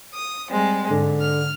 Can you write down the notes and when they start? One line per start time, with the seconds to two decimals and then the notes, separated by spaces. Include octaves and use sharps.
0.14 D#6
0.50 G3 G#3 C4
0.91 G#2 D3
1.20 F6